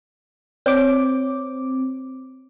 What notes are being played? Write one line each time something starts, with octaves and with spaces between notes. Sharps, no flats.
C4 C#5 D6